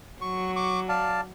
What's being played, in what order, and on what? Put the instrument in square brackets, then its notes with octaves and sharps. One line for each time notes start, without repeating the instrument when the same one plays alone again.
[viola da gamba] F#3 [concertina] C#6
[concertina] C#6 D6
D5 F5 A5